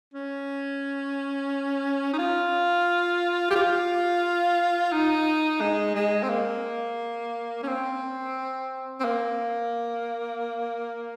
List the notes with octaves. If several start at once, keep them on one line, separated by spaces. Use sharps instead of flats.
C#4
D#4
F4
G4
F4
D#4
G#3
G#3
C4
A#3
C#4
C4
C4
A#3